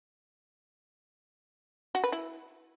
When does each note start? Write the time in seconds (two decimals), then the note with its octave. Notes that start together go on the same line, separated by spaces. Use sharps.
1.95 F#4
2.04 B4
2.12 E4